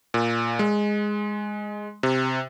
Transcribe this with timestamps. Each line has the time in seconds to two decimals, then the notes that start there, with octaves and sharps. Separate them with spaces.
0.14 A#2
0.59 G#3
2.03 C3